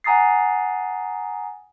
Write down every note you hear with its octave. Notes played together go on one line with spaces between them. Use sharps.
F#5 G#5 A#5 D#6 A6 C7